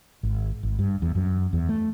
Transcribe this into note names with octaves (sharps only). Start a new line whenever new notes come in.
G#1
G#1
G2
E2
F#2
E2
A3